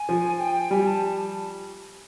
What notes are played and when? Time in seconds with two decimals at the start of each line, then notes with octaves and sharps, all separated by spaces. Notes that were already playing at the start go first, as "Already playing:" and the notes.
Already playing: G#5
0.09 F3
0.40 G5
0.71 G3 G#5
0.87 A5